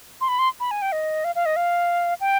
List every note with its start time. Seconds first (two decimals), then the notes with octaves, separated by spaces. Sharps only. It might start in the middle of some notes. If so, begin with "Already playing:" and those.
0.21 C6
0.28 B5
0.39 C6
0.60 B5
0.71 G#5
0.82 G5
0.92 D#5
1.24 F5
1.35 F5
1.46 D#5
1.56 F5
2.21 G5